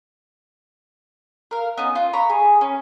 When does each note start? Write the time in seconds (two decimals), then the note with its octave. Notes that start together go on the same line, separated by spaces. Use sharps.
1.51 A#4 F5
1.77 B3 C#4 D#4
1.95 F4
2.13 A#5 B5 C#6
2.30 G#4
2.61 C#4